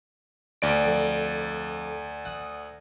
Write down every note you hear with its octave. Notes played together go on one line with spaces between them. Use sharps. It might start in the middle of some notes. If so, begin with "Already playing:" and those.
D2 D5 D7
F2
F#5 D#6